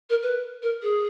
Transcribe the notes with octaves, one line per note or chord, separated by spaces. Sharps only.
A#4
B4
A#4
G#4